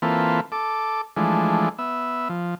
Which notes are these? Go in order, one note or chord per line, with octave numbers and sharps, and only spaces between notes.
E3 A#3 C4 F4 A4 B4
A4 D6
E3 F3 G#3 A3 D4
B3 E5
F3